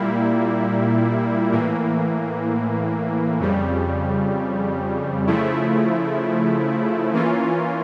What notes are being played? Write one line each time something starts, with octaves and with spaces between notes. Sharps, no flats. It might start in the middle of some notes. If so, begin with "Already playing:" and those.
Already playing: A#2 G3 A#3 E4
A2 E3 A#3
F2 C#3 G3
C#3 F3 A3 E4
E3 A#3 C#4 F4